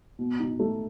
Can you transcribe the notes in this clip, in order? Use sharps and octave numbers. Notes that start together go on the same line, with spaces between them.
B2
D#4
A3